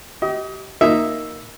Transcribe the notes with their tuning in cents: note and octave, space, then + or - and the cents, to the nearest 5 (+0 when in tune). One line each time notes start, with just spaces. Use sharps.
G4 -30 D#5 +30
A#3 +0 D#4 +0 E5 +0